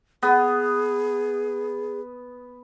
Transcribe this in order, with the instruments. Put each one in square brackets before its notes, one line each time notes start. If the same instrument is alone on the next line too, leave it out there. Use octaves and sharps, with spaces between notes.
[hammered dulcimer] B3 [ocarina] G#4